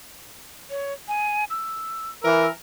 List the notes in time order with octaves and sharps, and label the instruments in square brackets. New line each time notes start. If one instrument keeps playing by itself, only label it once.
[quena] C#5
G#5
E6
[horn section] E3 A#4 [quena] E6